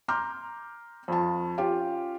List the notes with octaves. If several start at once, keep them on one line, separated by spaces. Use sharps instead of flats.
A#5 C6 D6 F6 G6
F2 F4 A5
C#4 F4 G4 F5 G5